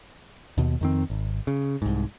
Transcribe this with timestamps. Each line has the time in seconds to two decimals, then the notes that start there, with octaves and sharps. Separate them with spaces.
0.58 D#2 B2
0.81 F2 D#3 C4
1.10 G#1
1.47 C#3
1.82 C2 G#2